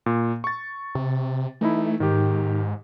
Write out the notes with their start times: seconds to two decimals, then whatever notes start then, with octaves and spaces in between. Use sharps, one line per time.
0.06 A#2
0.44 C#6 A6
0.95 C3
1.61 E3 A3 D#4 E4
2.00 G#2 D#3 G4